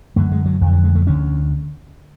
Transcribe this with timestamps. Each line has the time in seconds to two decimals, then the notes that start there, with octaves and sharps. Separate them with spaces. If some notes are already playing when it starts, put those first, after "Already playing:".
0.16 F#2 D3 A3
0.32 G#3
0.46 F#3
0.61 F2 F3
0.66 D3
0.73 F#3
0.84 G#3
0.95 A3
1.06 D2 D3 C#4